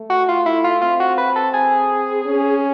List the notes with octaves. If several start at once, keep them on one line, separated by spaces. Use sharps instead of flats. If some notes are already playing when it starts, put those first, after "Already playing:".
Already playing: A3
F#4
F4
E4
F4
C4 F4
F#4
B4
A4
G#4
C#4